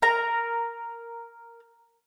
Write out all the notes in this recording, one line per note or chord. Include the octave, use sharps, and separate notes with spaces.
A#4 A#5